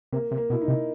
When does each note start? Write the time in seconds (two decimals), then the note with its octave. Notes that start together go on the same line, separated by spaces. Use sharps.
0.12 C3 A#3
0.31 C3
0.37 A#3
0.50 B2 E4
0.62 D#4
0.68 C3